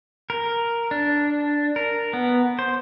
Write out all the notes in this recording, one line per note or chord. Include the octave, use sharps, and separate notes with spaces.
A#4
D4
A#4
B3
C5